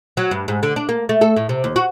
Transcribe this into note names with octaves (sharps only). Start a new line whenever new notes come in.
F#3
G2
G#2
D3
D4
A#3
A3
A4
A2
C3
D#2
F#4